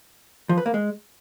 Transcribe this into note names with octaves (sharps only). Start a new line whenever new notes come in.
F3
B4
A#3
G#3